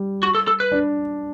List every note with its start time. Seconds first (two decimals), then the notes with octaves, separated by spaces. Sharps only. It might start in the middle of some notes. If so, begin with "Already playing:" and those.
Already playing: G3
0.23 F#4
0.35 A4
0.48 A4
0.60 B4
0.72 D4